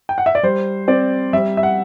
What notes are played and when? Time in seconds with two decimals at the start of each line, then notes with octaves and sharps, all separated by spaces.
0.09 G5
0.18 F#5
0.26 E5
0.35 D5
0.43 G3 C5
0.88 C4 D5
1.33 G3 E5
1.57 E5
1.63 F#5